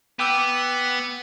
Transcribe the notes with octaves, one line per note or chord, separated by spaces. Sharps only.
B3 G5 D6 E6